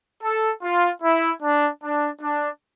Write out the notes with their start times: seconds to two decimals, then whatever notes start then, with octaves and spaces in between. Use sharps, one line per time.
0.22 A4
0.62 F4
1.02 E4
1.41 D4
1.82 D4
2.21 D4